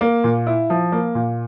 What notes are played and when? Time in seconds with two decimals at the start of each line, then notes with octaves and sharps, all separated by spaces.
0.01 A#3
0.24 A#2
0.47 E4
0.70 F3
0.92 A#3
1.15 A#2